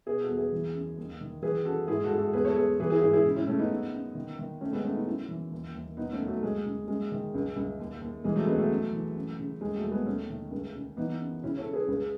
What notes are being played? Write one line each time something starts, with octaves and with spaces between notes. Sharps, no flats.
B2 G#4 B4
F#4 A4
E2
G#4 B4
E3
F#2
D#2
D#3
E3 G#4 B4
F#2 F#4 A4
G#2 E4 G#4
F#4 A4
G#2
F#4 A4
E2 G#4 B4
A4 C#5
E2 G#4 B4
E3 G#4 B4
E4 G#4
G#2 E4 G#4
E4 G#4
C#3
C#4 E4
C#3 A3 C#4
B3 D#4
F#2
F#2
D#3
D#3
F#2 A3 C#4
G#3 B3
F#2 A3 C#4
B3 D#4
F#2 C#4 E4
E3
D#2
D#2
D#2 B3 D#4
A3 C#4
D#2
F#3 A3
D#2 G#3
C#3
F#2 G#3
D#3
C#2
C#2
D#2
D#2
E3 G#3
F#3 A3
C#2 G#3 B3
F#3 A3
F#2
E3
F#2
C#3
D#2 G#3
F#3 A3
D#2
G#3 B3
D#2 A3 C#4
D#3
C#2
C#3
E3 B3 D#4
F#2
C#3 C#4 E4
A4 C#5
C#3
G#4 B4
C#2